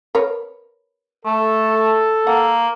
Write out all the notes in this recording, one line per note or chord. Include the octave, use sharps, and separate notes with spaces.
A#4 B4 C#5
A3 A4
A#3 F#5